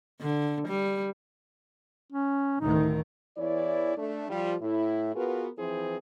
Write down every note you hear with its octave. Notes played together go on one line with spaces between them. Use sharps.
D3
G3
C#4
A1 D2 D#3 D#4
E2 E3 E4 C#5 D5
A3 D4
F3 G3 F4
A2 E4
B3 F4 F#4 G#4 A#4 B4
E3 F3 C4 E4 G#4 C5